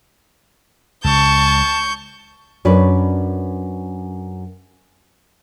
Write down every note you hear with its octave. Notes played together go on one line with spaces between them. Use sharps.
C#2 A5 C#6 G6
F#2 C#4 D4 B4